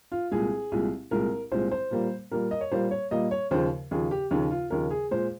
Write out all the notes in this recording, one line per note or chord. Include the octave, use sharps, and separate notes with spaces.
F4
C2 A#2 G#3 G#4
C2 A#2 G#3
C2 A#2 G#3 A#4
C2 A#2 G#3 C5
C5
A#2 G3 A#3
A#2 G3 A#3 A#4
D#5
C#5
A#2 G3 A#3 C5
C#5
A#2 G3 A#3 D#5
C#5
D#2 C#3 F3 C5
D#2 C#3 F3 G#4
G4
D#2 C#3 F3 D#4
F4
D#2 C#3 F3 A#4
G#4
A#2 G#3 C5